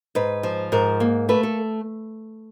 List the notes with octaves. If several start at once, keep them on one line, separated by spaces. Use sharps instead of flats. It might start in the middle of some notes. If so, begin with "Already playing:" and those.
G#2 B4
F3
G#2 A#4
A#3
A3 B4
A4